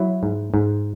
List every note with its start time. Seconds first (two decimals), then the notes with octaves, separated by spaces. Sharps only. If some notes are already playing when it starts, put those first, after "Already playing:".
Already playing: F#3 E4
0.23 G#2
0.54 G#2